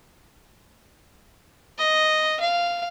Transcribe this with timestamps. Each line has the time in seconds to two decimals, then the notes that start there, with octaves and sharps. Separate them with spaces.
1.78 D#5
2.40 F5